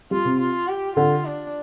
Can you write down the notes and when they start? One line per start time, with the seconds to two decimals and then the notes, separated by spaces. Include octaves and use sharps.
0.11 G3 F4
0.25 C3
0.40 F4
0.69 G4
0.96 D3 F4
1.25 D4